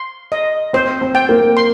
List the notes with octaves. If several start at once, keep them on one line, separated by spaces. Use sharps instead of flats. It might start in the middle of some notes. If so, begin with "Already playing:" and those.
Already playing: C6
D#5
C4 C5
C4
G5
A#3
C6